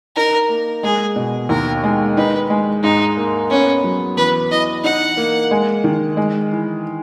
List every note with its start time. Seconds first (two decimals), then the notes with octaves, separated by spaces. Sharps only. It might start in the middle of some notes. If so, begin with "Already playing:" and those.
0.16 D#4 A#4
0.49 A#3
0.83 G#3 G#4
1.16 B2
1.49 D#2 A#4
1.84 G#3
2.17 D#4 B4
2.50 G#3
2.83 G#2 D#4
3.17 A#3
3.50 B3 C#4
3.84 F#3
4.17 E2 B4
4.50 E3 D#5
4.84 D#4 F#5
5.17 A#3
5.51 G#3
5.84 D#3
6.17 G#3
6.51 E3